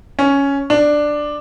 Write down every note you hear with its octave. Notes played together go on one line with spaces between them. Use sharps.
C#4
D4